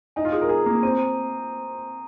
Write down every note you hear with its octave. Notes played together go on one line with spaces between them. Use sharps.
D#4 G#5
F4
G#4 D#6
A#4
G#4 A#5
A#3 A#5
C4 D#7
D#7